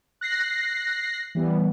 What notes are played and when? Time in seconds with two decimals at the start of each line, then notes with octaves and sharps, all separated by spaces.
0.21 F#6 A#6 C7
1.35 E3 G3 B3